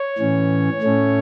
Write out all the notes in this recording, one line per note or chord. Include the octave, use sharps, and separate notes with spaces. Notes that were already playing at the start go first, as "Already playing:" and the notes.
Already playing: C#5
A2 E3 C#4
A2 A3 C#4